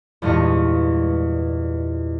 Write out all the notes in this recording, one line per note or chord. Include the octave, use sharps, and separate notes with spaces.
E2 G2 A#2 G#3 D#5 C#6